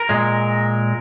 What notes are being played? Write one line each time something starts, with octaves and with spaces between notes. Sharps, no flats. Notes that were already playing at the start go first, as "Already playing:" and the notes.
Already playing: A#4
A#2 G#3